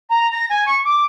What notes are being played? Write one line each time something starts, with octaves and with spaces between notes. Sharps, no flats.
A#5
A#6
G#5
C#6
D6